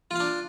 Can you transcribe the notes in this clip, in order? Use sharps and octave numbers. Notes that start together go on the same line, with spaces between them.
D4 F4 F5